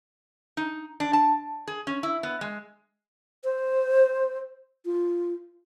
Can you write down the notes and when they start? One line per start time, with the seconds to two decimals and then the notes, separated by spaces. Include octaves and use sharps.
0.57 D#4
1.00 D4
1.13 A5
1.67 G#4
1.87 C#4
2.03 E4
2.23 B3
2.41 G#3
3.44 C5
4.85 F4